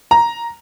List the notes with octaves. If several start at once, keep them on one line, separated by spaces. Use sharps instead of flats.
A#5